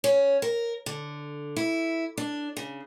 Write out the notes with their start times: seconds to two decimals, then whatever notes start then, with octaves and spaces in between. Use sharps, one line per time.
0.04 C#4
0.42 A#4
0.86 D3
1.57 E4
2.18 D4
2.57 C#3